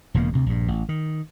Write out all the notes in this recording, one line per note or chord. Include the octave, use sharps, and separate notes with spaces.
E1 E2 C#3 A#3
D2 C3
A#1 G2
A1
D#3